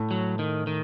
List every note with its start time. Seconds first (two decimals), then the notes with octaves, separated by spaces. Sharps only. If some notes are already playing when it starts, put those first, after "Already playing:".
Already playing: A2 A3
0.11 F#3
0.39 D#3
0.67 D#3